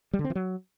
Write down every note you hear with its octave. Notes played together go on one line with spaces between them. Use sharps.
G3
D3
C4
E3
F#3